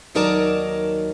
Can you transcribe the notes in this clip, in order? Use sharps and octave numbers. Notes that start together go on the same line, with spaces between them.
D#2 F#3 D#4 A#4 D5 A5